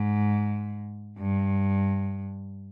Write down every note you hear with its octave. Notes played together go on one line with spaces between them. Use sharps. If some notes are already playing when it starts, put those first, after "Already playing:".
Already playing: G#2
G2